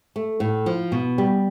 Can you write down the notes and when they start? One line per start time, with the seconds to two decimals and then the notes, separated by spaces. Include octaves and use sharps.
0.16 A3
0.40 A2
0.66 F3
0.92 B2
1.18 G3